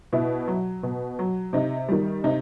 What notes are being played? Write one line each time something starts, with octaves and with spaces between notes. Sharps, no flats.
B2 E4
F#3
B2
F#3
C3 D#4
D#3 G3
C3 D#4